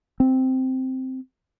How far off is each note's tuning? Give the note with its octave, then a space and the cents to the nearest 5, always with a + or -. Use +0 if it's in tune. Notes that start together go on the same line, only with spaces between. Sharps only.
C4 -5